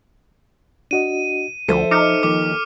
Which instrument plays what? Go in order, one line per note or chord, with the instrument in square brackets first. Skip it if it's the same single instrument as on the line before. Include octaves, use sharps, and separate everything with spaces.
[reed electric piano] D4 F#4 D#5 [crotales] D#7
[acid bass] D2 [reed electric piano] F3 [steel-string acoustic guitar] A4 C5 E5
[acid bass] D#4 [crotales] D6 F6 C#7
[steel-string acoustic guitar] D#2 [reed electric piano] F3 [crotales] D6